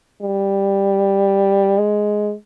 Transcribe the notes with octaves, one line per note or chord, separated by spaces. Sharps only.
G3
G#3